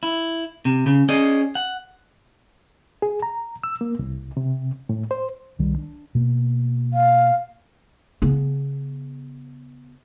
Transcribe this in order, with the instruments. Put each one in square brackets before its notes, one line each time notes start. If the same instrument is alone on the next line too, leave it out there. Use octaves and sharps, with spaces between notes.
[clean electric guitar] E4
C3
C#3
C#4 G#4 D5 D#5
F#5
[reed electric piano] G#4
A#5
E6
A#3
C2
C3
A2
C5
[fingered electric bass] C2 D#3 G3
D4
B2 A#3
[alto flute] F5
[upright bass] C#3 B3